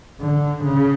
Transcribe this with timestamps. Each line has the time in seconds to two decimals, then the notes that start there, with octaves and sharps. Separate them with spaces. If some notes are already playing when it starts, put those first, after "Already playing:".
0.21 D3
0.64 C#3